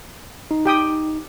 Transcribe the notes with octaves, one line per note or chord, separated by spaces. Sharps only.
D#4
G4 G5 D#6